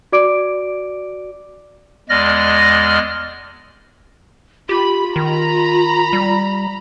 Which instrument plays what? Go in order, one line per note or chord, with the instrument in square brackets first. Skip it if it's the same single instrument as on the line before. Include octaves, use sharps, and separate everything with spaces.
[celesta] F#4 D5 D6 D7
[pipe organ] E2 G#3 D5 D#5 F6 A#6
[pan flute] F4 [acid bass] G4 [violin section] B5
[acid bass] D#3 [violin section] A#5 B5
[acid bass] G3